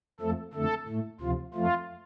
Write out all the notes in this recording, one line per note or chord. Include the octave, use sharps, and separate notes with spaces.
F2 F3 A3 A4
F2 D3 A3 A4
A2 A3
D2 C3 F3 F4
F2 F3 A3 F4